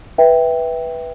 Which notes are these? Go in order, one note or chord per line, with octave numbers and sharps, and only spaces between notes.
B4 E5 G5